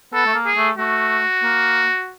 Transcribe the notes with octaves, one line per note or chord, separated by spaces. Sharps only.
B3 A4
A3
A#3
G#4
A3
A3 F#4
A#3